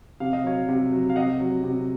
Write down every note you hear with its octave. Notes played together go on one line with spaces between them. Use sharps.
C3 F5
D#5
F#3 C#5 F5
C3
F#3
F5
C3 D#5 F#5
F#3
C3